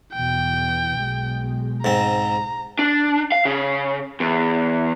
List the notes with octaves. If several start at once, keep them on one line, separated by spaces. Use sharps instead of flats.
E2 B2 E3 G5
B1 G#3
G#2 C4 A#5
D4
F5
C#3
E2